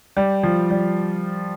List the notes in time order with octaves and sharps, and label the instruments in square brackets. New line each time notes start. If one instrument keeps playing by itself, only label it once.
[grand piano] G3
F3
G3